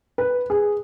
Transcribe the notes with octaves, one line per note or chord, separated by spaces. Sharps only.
B4
G#4